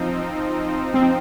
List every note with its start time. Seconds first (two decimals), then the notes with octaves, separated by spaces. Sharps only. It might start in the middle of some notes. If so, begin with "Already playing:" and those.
Already playing: F3 C4 D#4
0.94 C4